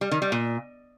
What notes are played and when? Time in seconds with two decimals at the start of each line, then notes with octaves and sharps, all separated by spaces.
0.01 G3
0.11 D#3
0.22 G3
0.32 A#2